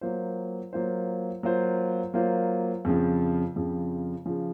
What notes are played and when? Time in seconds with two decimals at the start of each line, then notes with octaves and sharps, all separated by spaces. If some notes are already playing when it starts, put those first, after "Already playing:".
0.01 F#3 A#3 F4 C5
0.73 F#3 A#3 F4 C5
1.43 F#3 A#3 F4 C5
2.14 F#3 A#3 F4 C5
2.85 F2 C#3 F3
3.56 F2 C#3 F3
4.26 C#3 F3